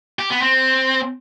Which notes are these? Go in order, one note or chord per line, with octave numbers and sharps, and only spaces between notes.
G4
B3
C4